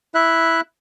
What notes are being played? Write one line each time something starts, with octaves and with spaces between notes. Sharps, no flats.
E4 E5 F#6